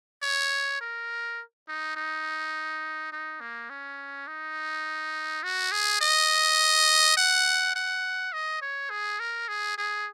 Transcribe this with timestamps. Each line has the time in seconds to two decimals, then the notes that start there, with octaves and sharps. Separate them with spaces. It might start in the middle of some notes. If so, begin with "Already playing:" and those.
0.22 C#5
0.81 A#4
1.68 D#4
1.96 D#4
3.12 D#4
3.41 A#3
3.70 C#4
4.27 D#4
5.43 F#4
5.72 G#4
6.01 D#5
7.17 F#5
7.76 F#5
8.33 D#5
8.62 C#5
8.90 G#4
9.20 A#4
9.48 G#4
9.78 G#4